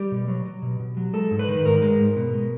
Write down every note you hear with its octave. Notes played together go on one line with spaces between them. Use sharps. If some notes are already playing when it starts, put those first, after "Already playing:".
Already playing: G3 G4
B2
F#3
F#3
B2
B2
F#3
G#3 A4
G#2
B4
D#3
G#2 A#4
G#3
G#2
B2
G#3